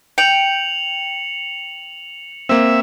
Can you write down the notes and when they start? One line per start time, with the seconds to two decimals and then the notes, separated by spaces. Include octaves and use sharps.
0.18 G5 C#7 F7 F#7
2.49 A#3 C4 E5